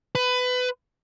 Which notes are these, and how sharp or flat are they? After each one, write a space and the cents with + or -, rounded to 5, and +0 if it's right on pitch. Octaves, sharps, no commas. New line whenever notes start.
B4 +20